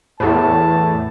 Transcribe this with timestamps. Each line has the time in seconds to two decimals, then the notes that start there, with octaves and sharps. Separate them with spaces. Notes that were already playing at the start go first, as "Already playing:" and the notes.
0.20 E2 A2 A5